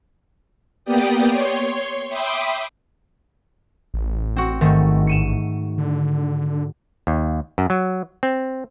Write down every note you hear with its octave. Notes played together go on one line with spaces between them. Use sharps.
A#3 B3 G4 D5 G5 D#6
C#5 C6
E5 G5 B5 C6 D6 D#6
A1
C4 F#4
G#2 D#3 A3
C#7 D#7 E7
D3
D#2
F#2
F#3
C4